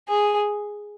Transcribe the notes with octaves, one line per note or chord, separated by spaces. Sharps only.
G#4